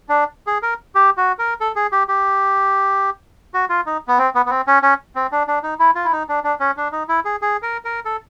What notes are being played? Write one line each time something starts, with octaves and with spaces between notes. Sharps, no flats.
D4
G#4
A#4
G4
F#4
A#4
A4
G#4
G4
G4
F#4
F4
D#4
B3
C4
B3
B3
C4
C#4
C#4
C4
D4
D4
D#4
E4
F4
E4
D#4
D4
D4
C#4
D4
D#4
E4
G#4
G#4
A#4
A#4
A4